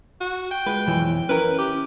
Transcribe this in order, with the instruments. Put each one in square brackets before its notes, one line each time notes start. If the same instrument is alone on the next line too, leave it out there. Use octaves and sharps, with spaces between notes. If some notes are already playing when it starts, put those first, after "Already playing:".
[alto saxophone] F#4
G5
[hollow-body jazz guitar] G#3 F4 B4
B1 F2 E3
[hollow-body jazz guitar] C#4 E4 A#4 [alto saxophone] B4
[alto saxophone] G4